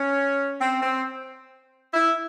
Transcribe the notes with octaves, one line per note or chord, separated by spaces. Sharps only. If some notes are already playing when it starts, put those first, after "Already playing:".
Already playing: C#4
C4
C4
E4